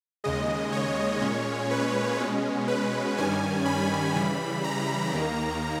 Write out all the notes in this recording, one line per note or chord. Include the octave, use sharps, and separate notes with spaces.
D#2 C#3 G#3 D#5
C#5
A#2 G#3 C#4
B4
B2 G#3 C#4
B4
G2 D#3 G3 C#4 G#5
B5
C#3 E3 G3 B5
A#5
D#2 D#3 A#3